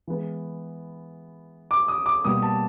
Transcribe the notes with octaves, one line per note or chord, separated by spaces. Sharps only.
E3 G#3 B3
D6
D#6
D6
B2 G3 A#3 D#6
A5